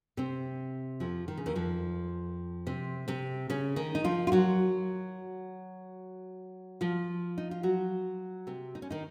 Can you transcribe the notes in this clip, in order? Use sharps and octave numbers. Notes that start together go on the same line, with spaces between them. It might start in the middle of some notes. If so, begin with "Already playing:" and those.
C3 C4
F2 F3
D#3
C#3
D#2 D#3
F2 F3
C3 C4
C3 C4
C#3 C#4
D#3 D#4
D#4
F3 F4
F4
F#3 F#4
F3 F4
D#4
F4
F#3 F#4
C3 C4
D#4
C#4
D#3 D#4